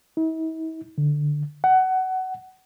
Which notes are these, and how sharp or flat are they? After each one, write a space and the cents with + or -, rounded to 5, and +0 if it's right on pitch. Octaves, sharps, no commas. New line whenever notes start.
E4 -45
D3 +5
F#5 +20